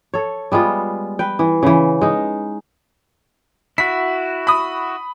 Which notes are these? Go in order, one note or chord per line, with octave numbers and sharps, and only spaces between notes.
A4 C#5
G3 G#3 B3 F4
B4 G5
E3
C#3 E3
G#3 D#4
E4 F#4 B6
B5 D#6